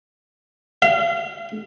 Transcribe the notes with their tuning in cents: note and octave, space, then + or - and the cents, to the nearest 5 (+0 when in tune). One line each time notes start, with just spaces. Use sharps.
F5 -35